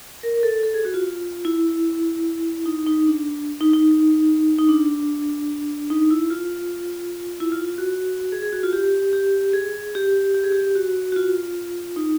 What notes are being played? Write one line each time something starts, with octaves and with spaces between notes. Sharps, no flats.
A#4
A4
A4
G#4
F#4
F4
E4
D#4
D#4
D4
D#4
D#4
D#4
D4
D#4
E4
F4
E4
F4
F4
F#4
G#4
G#4
F#4
F4
G4
G4
G#4
G4
G4
G#4
G4
F#4
F#4
F4
D#4